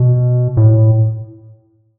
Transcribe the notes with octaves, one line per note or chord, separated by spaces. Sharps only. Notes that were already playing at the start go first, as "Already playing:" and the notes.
Already playing: B2
A2